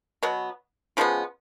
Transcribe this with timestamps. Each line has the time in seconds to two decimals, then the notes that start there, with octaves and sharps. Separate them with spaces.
0.23 B2 F#3 B3
0.97 C#3 F3 G#3 B3